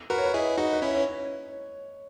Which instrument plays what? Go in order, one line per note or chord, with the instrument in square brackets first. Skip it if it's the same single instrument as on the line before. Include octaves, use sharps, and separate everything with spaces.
[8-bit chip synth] F#4 A#4 [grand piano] B4
[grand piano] C#5
B4
[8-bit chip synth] E4 G#4 [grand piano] D#5
[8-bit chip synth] D#4 F#4 [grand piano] D#5
[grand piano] B4
[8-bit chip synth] C#4 E4 [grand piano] C#5
[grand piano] C#5